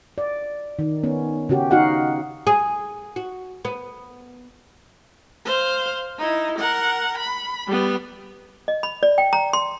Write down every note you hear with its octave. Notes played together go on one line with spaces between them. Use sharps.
D5
D#3
B3 C#4
C#3 C#4 F#4 G4
D#4 F#4 F5 F#5
G#4
F#4
B3
C5 F5
D#4 E4
A#4 F#5
B5
G3 B3
D#5
B5
D5
G5
A#5
C6